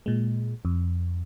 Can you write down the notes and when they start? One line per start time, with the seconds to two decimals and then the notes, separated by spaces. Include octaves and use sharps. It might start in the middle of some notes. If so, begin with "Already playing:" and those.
0.06 A#2 G#3
0.65 F2